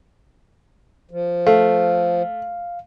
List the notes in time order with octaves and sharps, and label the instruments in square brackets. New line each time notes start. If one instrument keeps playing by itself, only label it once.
[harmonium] F3
[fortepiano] A3 [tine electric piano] F5